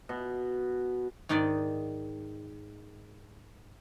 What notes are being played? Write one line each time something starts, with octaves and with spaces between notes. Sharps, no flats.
B2
G#2 D#3 D#4 D5 D#5